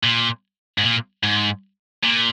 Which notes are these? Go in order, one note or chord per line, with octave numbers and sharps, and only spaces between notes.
A#2
G#2
A#2
G#2
A#2